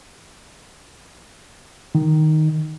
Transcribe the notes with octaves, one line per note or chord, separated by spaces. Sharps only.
D#3